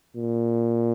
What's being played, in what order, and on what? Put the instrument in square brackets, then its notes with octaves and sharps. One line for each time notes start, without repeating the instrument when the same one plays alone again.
[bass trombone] A#2